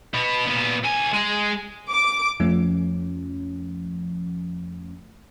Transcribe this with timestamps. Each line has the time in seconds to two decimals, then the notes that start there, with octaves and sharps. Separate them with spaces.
0.14 B2 B3
0.48 A#2 B3
0.84 D2 G#5
1.14 G#3 G#4
1.90 D6
2.40 F2 F3 A3 C#4